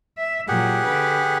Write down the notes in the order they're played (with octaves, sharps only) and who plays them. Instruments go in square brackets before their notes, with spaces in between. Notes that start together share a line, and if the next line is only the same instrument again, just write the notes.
[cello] E5
[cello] A#2 F#3 [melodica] G4 G#4 F#5
[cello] D3 B4